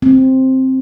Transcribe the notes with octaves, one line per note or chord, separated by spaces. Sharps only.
C4